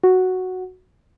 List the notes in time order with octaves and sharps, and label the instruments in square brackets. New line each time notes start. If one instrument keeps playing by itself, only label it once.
[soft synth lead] F#4